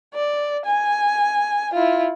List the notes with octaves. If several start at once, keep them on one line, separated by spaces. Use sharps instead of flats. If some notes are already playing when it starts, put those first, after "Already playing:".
D5
G#5
E4 F4